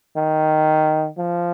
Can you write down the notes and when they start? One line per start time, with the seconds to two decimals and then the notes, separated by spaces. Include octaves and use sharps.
0.16 D#3
1.18 F3